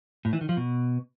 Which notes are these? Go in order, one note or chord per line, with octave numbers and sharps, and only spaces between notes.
A2
E3
D#3
F3
B2